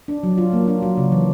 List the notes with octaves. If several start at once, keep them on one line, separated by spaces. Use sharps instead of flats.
D4
F#3
F4
A#3
D4
F#3
C#3
E3